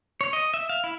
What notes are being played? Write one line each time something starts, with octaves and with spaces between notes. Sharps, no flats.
C#5
D#5
E5
F5
E4